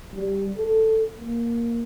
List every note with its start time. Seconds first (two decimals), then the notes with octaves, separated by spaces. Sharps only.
0.15 G3
0.57 A4
1.17 A#3